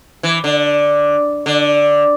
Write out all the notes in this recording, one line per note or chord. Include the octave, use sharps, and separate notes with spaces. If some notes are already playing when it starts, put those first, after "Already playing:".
E3
D3
D3